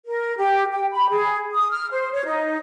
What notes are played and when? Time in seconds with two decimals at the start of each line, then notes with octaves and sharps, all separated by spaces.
0.06 A#4
0.37 G4
0.73 G5
0.92 B5
1.11 G#4
1.54 D#6
1.71 F6
1.91 C5
2.13 C#5
2.26 D#4